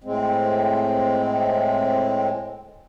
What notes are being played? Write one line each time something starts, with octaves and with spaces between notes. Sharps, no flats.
A2 G#3 C4